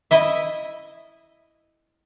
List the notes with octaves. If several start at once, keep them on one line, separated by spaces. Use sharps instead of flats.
E4 D#5 E5